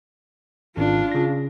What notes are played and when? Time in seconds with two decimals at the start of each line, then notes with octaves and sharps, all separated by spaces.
0.77 G#1 D4 F4
1.12 C#3 A#6